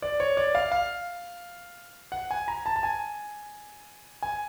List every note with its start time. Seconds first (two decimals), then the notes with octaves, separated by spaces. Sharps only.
0.02 D5
0.20 C#5
0.37 D5
0.55 F5
0.72 F5
2.12 F#5
2.31 G#5
2.48 A#5
2.66 A5
2.76 A5
2.83 G#5
4.23 G#5